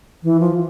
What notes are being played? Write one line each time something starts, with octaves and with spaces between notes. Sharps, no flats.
E3
F3